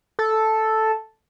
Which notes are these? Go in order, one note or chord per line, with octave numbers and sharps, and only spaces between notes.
A4